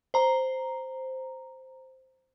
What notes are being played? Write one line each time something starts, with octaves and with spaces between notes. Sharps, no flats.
C5 A#5